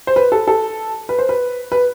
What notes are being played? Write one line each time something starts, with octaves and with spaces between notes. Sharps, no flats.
C5
B4
A4
A4
B4
C5
B4
B4